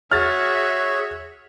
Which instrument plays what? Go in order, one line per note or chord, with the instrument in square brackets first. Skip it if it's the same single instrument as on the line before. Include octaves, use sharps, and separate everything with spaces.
[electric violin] F#4 E5 [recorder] G#4 [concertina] C#5 [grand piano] F6 A6